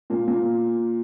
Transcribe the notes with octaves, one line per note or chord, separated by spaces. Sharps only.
A#2 A#3
A#2 A#3